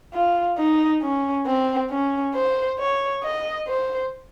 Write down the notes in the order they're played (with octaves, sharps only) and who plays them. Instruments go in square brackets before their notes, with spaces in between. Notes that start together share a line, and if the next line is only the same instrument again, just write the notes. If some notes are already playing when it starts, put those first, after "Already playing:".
[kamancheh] F4
D#4
C#4
C4
C#4
C5
C#5
D#5
C5